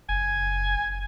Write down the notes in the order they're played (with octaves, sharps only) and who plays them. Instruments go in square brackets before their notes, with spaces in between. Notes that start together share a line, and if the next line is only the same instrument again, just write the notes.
[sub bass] F#1 [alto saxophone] G#5